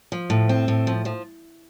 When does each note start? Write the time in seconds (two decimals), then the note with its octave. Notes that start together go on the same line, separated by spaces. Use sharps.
0.12 F3
0.30 A2
0.49 C4
0.68 A2
0.87 F3
1.05 F3